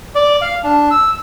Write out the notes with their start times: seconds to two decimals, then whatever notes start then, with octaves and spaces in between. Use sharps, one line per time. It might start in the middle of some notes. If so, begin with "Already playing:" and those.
0.15 D5
0.41 F5
0.64 D4
0.91 E6